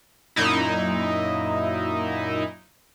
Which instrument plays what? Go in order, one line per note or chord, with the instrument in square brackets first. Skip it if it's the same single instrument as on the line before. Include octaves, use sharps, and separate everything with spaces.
[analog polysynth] F#2 A#2 D#4 E4